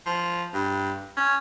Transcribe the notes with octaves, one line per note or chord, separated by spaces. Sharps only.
F3
G2
C#4